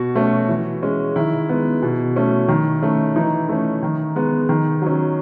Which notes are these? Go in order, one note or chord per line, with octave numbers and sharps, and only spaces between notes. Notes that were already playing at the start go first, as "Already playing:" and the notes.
Already playing: B2 F#4
A3 C#4
E3
G#3 C#4
D#3 E4
G#3 B3
B2
A3 C#4
D#3
A3 C#4
E3 D#4
A3 C#4
D#3
G#3 B3
D#3
F#3 C#4